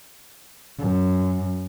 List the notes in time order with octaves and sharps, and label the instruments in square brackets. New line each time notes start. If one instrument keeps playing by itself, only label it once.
[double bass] F#2